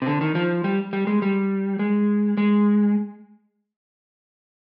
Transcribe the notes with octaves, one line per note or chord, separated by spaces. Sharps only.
C3
D3
D#3
F3
G3
G3
G#3
G3
G#3
G#3